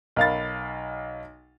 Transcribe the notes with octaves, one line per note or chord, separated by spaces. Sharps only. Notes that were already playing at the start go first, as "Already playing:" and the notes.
B1 A#4 F5 B5 A6